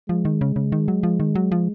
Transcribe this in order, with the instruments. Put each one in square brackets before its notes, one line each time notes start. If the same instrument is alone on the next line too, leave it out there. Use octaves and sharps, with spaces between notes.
[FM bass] F3 [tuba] G#3
[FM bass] D#3
C#3
C#3
D#3
F#3
F3
D#3
F#3
F3